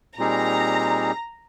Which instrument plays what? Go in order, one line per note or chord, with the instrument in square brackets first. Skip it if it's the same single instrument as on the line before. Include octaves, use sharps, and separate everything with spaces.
[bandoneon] A#2 G3 C4 D#4 G#4 [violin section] A#5